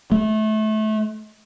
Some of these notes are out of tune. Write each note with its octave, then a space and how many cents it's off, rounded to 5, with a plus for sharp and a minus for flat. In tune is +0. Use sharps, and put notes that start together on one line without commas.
A3 -25